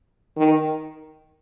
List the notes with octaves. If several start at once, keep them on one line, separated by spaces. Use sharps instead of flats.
D#3